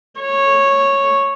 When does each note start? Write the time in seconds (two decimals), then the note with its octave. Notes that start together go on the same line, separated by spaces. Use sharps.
0.21 C#5